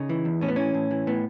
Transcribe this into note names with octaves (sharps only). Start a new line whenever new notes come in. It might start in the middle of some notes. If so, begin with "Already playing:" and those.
Already playing: C#3 D#4
E3
E2
A2 C#4
B3
E3 C#4
A2
E3
A2 B3